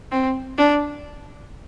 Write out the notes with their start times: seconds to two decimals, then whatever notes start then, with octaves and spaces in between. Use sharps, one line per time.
0.12 C4
0.57 D4